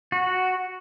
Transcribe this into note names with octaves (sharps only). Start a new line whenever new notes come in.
F#4